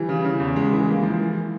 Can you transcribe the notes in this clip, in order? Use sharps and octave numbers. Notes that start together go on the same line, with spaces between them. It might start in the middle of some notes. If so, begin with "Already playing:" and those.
Already playing: E3 G3
C#3
C#3
E2
G#3
E3
A#3
F3
E3